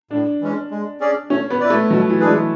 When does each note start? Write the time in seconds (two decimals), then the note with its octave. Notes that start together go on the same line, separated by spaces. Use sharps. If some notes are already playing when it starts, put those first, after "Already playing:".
0.11 A2 D4
0.41 E3 G#3 C#4
0.71 G#3
1.00 C#4 G#4 D5
1.30 A3 C#4
1.50 B3
1.60 E4 B4 D5
1.70 A3
1.90 B2 F#3
2.10 E3
2.20 G#3 D4 G#4 B4
2.30 E3